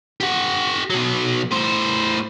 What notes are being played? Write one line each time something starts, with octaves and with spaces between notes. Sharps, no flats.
G4 F#5
B2 F#3
A2 C5